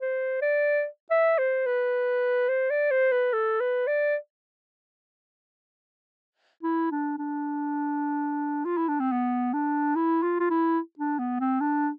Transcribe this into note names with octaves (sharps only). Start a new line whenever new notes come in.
C5
D5
E5
C5
B4
C5
D5
C5
B4
A4
B4
D5
E4
D4
D4
F4
E4
D4
C4
B3
D4
E4
F4
F4
E4
D4
B3
C4
D4